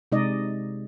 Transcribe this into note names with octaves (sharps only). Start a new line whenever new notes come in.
C3 G#3 D#4 D5 D#5